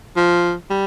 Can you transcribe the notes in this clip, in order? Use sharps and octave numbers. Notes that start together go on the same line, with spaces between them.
F3
G3